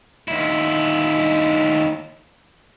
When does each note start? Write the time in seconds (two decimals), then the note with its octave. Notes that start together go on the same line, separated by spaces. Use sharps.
0.28 D#2 E4